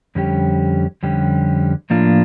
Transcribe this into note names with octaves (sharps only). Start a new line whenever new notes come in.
F2 D3 G3 C#4 G4
F2 D3 G3 C#4 G4
A2 F3 A#3 D4 F4